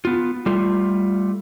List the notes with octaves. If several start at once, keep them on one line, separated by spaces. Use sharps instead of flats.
B3 F4
G3 A3 F4